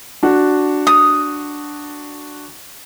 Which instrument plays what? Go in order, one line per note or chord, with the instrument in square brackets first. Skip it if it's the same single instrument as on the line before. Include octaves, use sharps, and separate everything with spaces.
[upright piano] D4 F#4
[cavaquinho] D#6